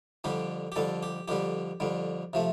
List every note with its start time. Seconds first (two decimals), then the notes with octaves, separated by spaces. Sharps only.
0.24 F2 D3 G3 G4
0.72 G4
0.76 F2 D3 G3 A4
1.03 G4
1.28 F2 D3 G3 G4
1.80 F2 D3 G3
2.33 C3 F3 A3